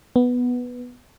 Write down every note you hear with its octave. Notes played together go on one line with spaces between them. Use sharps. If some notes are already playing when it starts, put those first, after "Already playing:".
B3